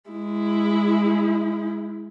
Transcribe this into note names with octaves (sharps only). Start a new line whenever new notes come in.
G#3 E4